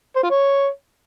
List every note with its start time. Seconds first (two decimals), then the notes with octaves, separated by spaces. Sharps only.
0.16 C5
0.23 F4
0.30 C#5